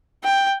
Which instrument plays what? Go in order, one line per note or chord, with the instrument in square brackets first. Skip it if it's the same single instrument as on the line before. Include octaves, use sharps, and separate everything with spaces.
[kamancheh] G5